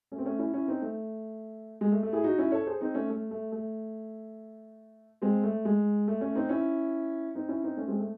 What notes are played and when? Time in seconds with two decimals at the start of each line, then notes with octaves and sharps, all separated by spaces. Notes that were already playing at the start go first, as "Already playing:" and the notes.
0.12 A3 C#4
0.18 C4
0.25 A3 C#4
0.39 C#4 E4
0.53 C#4 E4
0.68 C4 D#4
0.82 A3
1.81 G#3
1.92 A3
2.03 A3
2.13 E4 G#4
2.24 D#4 F#4
2.38 C#4 E4
2.52 A4 C#5
2.67 G#4 C5
2.81 C4 D#4
2.94 A3 C#4
3.10 A3
3.31 A3
3.52 A3
5.22 G#3 C4
5.43 A3
5.65 G#3
6.08 A3
6.21 A3 C#4
6.35 C4 D#4
6.49 C#4 E4
7.35 C4 D#4
7.48 C#4 E4
7.64 C4 D#4
7.77 A3 C#4
7.88 G#3 C4
7.99 A3